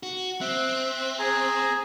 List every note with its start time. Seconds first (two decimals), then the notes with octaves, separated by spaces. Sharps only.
0.03 F#4
0.41 C4 E5 F#6
1.19 G#4 G#5 A#5